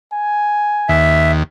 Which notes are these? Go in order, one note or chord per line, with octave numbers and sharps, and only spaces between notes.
G#5
D#2 E5